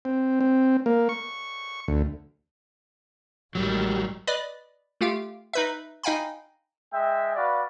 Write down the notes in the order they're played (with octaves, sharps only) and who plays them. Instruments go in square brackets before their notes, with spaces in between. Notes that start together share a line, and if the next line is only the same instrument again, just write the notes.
[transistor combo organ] C4
C4
A#3
C#6
D2
[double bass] A1 D#3 [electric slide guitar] F#3 G3
[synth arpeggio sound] B4 D5 D#5 B5
A3 F4 G4 F5
D#4 B4 E5
D#4 D#5 F5 G5 G#5 B5
[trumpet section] G#3 E5 G5
F#4 B4 D5 F5